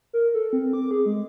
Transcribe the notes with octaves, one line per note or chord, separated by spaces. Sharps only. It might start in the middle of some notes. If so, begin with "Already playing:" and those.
A#4
A4
C4
D6
G#4
G#3